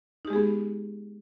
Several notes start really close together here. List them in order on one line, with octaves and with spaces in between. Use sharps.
D#4 G4 G#3 G#4 B3